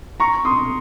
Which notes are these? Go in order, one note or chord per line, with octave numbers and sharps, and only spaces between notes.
A#5 C#6
C6 D#6